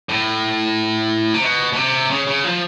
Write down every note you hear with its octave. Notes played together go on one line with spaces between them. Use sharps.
A2
C3
B2
B2
C3
C#3
C#3
F3